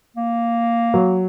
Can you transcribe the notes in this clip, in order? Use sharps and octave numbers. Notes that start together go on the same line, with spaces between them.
A#3
F#3